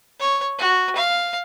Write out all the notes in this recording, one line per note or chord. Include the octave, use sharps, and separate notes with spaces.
C#5
F#4
F5